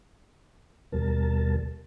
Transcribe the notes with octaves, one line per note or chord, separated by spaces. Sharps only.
D#2 B2 G3 A#4 A5